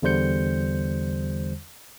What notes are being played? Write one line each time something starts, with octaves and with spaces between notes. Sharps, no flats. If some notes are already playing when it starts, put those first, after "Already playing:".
E2 D3 G3 C5 G6 C#7